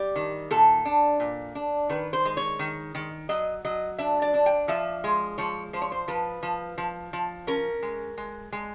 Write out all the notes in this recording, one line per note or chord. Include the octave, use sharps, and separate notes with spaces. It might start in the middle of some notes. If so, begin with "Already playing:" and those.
Already playing: G3 G4
D#3
A#2 A4
D4
A#2
D4
D#3 B4
C5
G#3
C#5
D#3
D#3
F#3 D#5
F#3 D#5
D4 E5
D5
D4
G5
F3 E5
G#3
F3 C#5
F3 C5
C#5
C5
F3 B4
F3
F3
F3
C#4 A#4
G#3
G#3
G#3